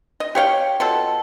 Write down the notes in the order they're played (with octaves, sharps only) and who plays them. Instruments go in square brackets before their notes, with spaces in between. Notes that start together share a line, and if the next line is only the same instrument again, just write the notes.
[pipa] D#5
G4 C#5 F5 G5
B2 F4 A4